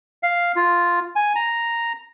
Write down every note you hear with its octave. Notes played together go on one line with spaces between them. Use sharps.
F5
F4
G#5
A#5